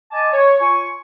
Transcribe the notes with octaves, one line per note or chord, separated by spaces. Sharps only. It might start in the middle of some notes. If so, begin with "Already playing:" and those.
D#5 G#5 A5 D6
C#5
F4 G#5 C#6